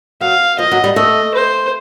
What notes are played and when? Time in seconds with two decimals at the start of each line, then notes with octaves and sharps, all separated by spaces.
0.21 F#3 F5
0.58 F3 D#5
0.71 F#3
0.84 G3
0.96 A3 D#5
1.34 C5